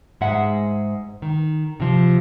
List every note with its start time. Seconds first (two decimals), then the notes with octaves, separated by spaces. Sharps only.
0.21 G#2 G#3 E5 F#5
1.22 D#3
1.80 C3 F3